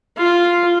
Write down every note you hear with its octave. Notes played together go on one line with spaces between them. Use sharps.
F4